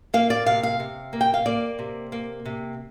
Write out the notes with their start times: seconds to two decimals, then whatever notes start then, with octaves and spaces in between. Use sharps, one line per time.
0.14 A#3 F5
0.30 D5
0.46 C3 F5
0.63 F5
0.80 C3
1.13 A#3
1.21 G5
1.34 F5
1.46 A#3 D5
1.79 C3
2.12 A#3
2.45 C3